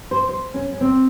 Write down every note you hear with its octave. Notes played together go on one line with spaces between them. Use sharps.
C5
C5
C#4
C#4
C4